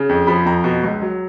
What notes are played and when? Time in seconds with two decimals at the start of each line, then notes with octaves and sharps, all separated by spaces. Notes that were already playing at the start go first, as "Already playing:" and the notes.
Already playing: C#3
0.09 F2
0.27 F3 B5
0.45 F2 A#5
0.64 B2
0.83 C#2
1.02 F#3